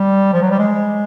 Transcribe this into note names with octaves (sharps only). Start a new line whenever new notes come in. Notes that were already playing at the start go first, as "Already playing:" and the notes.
Already playing: G3
F3
F#3
G3
G#3